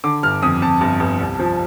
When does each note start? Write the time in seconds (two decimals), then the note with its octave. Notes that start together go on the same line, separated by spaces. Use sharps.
0.04 D3 D6
0.23 G1 F6
0.43 F2 D#6
0.62 F2 A5
0.81 G1
1.00 G1
1.19 C2
1.39 F3